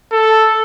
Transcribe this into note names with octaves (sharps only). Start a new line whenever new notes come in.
A4